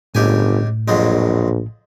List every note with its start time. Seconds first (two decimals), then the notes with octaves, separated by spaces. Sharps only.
0.15 G1 C#2 A2 G4 G#5
0.88 A#1 F2 F#3 G#3